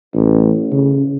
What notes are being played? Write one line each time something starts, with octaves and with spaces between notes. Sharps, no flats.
A1
C#3